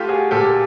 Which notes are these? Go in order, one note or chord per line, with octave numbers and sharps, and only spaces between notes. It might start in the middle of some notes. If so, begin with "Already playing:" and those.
Already playing: A3 F4 G4
F#4 G#4
A#2 G4 A4
A4